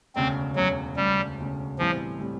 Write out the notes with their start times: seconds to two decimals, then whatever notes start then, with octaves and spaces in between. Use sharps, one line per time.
0.15 E1 D2 C#3 C4
0.56 E1 D2 C#3 F#3
0.96 E1 D2 C#3 G3
1.37 E1 D2 C#3
1.78 B1 A2 E3 F3 G3 C4
2.20 A2 E3 G3 C4